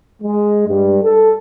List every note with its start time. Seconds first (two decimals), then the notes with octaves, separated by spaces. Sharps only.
0.22 G#3
0.68 G2
1.04 A4